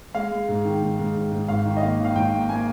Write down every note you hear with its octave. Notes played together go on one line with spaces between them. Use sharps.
G#3 F5
G#3
G#2
D#3
G#2
G#2
G#2
G#2
G#1 F5
D#3
D#5
A#3 F5
D#3
F5
G#1 G5
A#3
A#3 G#5